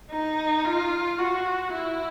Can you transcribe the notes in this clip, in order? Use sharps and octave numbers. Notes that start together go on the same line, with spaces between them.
D#4
F4
F#4
E4